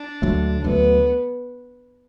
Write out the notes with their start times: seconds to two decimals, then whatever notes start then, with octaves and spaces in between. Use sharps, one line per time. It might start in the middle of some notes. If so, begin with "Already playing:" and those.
Already playing: D4
0.22 D2 D3 F#3 A3
0.64 D2 D3 F#3 A3 B3